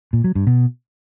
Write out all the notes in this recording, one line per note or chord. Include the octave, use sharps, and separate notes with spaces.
A#2
F#3
G2
B2